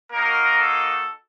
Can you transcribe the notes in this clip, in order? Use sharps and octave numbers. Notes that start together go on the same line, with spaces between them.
A#3 D#4 F#4 A#4
A4